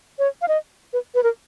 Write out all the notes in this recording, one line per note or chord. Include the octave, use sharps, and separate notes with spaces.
C#5
F5
D#5
B4
B4
A#4